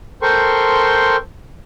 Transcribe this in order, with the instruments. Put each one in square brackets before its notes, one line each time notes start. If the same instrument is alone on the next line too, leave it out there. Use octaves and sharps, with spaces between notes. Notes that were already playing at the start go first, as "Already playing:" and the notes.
[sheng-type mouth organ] A4 A#4 C5 G5 C6 C#6